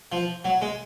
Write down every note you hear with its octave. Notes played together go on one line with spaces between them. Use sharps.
F3
F#3
G#3